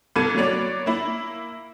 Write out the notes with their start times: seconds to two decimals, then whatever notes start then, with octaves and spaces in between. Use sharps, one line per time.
0.16 C2 B3 A4 G#6 D#7
0.35 F#3 A#3 B3 C#5 D5
0.86 A#3 E4